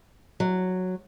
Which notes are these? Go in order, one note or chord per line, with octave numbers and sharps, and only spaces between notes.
F#3